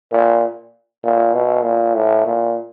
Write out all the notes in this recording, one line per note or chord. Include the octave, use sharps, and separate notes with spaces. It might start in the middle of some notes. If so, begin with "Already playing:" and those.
A#2
A#2
B2
A#2
A2
A#2